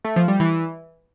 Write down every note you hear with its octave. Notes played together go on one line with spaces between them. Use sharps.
A3
F3
G3
E3